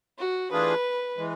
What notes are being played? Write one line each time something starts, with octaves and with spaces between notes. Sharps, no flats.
F#4
E3 A3 D4 F4 G#4 B4
E3 G#3